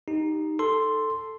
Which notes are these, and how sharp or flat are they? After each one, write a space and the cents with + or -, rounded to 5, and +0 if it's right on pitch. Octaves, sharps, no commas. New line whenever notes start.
D#4 +0 G4 +0
A4 +0 C6 +0